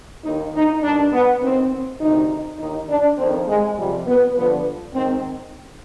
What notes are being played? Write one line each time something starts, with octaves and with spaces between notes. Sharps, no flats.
D#2 D#3 D#4
D#4
G2 D#3 D4
B3
D#2 D#3 C4
D2 C3 D#3 D#4
D#2 D#3 D#4
D4
F2 D#3 C4
G#3
F2 C3 F3 G3
B3
G2 D3 F3 B3
G#2 D#3 C4